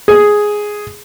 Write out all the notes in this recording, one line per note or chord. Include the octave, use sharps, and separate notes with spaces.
G#4